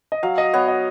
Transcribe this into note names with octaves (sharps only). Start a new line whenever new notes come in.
D#5
F#3 F5
D#5
B3 C#5
D#5